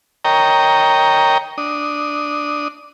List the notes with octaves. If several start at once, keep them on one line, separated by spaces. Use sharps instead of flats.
A#4 C#5 D#5 G5 A#5
D4 D#6